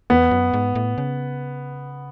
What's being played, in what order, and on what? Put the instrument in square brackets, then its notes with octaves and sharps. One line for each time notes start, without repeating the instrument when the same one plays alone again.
[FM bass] E2 [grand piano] B3
[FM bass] F#2
G#2
A2
C#3